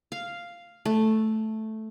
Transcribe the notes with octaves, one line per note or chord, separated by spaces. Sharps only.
F5
A3